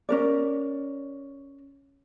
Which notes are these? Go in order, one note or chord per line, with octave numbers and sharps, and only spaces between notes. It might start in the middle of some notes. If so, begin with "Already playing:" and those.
C#4 A#4 D5